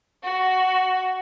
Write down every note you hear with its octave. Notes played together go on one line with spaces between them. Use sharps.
F#4